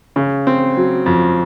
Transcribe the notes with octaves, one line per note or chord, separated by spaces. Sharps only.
C#3
C4
F#3
F2